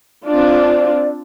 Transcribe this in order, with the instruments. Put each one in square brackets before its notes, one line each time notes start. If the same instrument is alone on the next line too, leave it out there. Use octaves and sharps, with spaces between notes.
[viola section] C4 D4 F4 [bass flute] D5